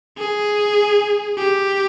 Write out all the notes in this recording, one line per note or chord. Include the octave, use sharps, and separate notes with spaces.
G#4
G4